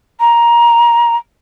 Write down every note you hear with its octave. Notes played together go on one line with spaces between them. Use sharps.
A#5